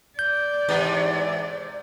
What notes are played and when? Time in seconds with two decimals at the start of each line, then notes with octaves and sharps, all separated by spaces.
0.19 D5 G6
0.69 G#2 C3 E3